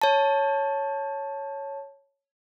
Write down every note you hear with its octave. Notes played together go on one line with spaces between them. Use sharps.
C#5 A5